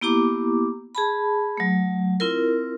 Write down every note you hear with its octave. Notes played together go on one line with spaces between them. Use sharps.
A#3 B3 E4 G4 A#5 D6
G#4 A5 B5
F#3 A3
C4 E4 F4 A#4